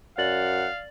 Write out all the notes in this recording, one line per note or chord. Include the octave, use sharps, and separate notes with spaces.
F#2 D5 F5 F#5 A6 F#7